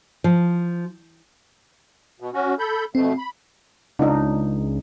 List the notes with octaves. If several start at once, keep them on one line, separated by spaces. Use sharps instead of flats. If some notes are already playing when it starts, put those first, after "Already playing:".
F3
B2
C#4 F#4
A4 B5 G6
F2 B2 A3 C4
B5
C#2 D4 D#4